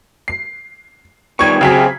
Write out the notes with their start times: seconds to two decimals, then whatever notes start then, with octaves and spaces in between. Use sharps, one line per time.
0.28 C7
1.39 D#3 G3 B3 C#6 G#6
1.61 C#3 F#3 C4 G4 G#4 B6